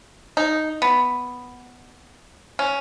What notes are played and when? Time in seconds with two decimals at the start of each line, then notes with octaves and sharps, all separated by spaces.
0.37 D#4
0.82 B3
2.59 C#4